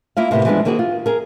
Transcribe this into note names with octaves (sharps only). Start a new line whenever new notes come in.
A#3 E4 F4 F5
A2 C3 A#3 B3 G4
E3 F3 G3 G#3 B3 D4
D#3 A#3 C4 F#4 G#4
F4
G#4 A#4